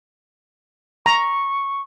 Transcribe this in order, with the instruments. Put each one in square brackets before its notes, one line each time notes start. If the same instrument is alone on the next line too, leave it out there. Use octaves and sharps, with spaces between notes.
[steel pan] A#5 [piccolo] C#6